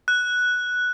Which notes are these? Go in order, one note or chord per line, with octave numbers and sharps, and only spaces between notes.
F#6